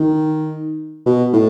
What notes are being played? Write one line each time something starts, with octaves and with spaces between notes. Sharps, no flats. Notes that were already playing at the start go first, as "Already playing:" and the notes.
Already playing: D#3
B2
A2